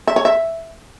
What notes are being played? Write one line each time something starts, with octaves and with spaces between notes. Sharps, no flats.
E5
C#5
E5